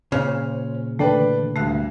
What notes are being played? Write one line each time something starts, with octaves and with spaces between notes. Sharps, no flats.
A#2 C#3 C#4 C5 C#5 G#5 F6
D3 E3 A3 B4 D5 G5
D2 G2 A3 F#6